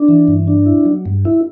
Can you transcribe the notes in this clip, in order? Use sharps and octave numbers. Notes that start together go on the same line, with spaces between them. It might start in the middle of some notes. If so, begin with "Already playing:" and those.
Already playing: D4
E3
G2
D4
E4
F#3
G2
E4